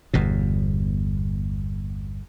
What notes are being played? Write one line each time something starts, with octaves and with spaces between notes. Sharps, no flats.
G1 E2 B2